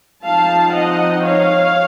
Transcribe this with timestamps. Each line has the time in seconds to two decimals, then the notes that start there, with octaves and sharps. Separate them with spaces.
0.24 F3 C4 D#4 F5 A5
0.73 D#5 F#5
1.22 C#5 F5